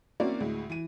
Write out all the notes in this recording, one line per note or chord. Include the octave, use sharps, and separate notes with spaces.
A#3 C4 C#4 E4 F#4 D5
D2 A2 G#3
E3 D#7